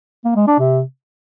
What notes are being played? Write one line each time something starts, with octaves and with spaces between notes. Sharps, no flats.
A#3
G#3
D4
C3